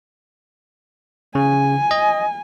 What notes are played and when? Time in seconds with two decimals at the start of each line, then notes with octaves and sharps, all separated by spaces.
1.35 C#3 G#5
1.91 D#5